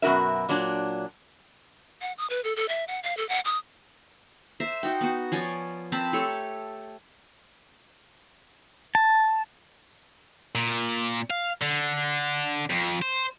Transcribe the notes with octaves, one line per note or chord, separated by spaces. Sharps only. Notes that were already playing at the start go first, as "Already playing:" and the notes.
F#2 B2 F#4 A#4 E5
A#2 F#3 D4
F#5
D#6
B4
A4
A4
E5
F#5
F5
A4
F#5
D#6
C5 E5 A#5
D#4 F#4 G5
B3 F#4
F3 C#4 D5 G#5
C4 A#4 A5 B5
A3 G4 A4 C#5
A5
A#2
F5
D3
F2
C5